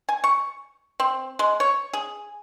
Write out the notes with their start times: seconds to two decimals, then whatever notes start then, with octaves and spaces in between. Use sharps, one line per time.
0.09 G#5
0.24 C#6
1.00 C4
1.39 G#3
1.60 C#5
1.93 G#4